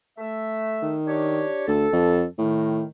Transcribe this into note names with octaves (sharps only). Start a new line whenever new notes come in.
A3 E5
D#3
D4 G4 C#5
D2 A4
F2
A2 D#3